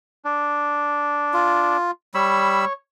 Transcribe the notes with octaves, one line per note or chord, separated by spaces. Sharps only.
D4
F4
G3 C#5 B5 E6